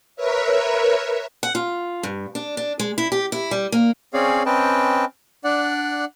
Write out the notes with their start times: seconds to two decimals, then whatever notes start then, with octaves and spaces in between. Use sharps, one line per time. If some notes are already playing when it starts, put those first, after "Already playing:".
0.16 A#4 B4 C#5 E5
1.43 F#5
1.55 F4
2.03 G2
2.35 D4
2.57 D4
2.79 G#3
2.98 E4
3.12 G4
3.32 E4
3.51 G3
3.72 A#3
4.14 C4 C#4 G#4 C#5 D5 F5
4.46 C4 C#4 B4 D#5 G5 A5
5.44 D4 D5 F#5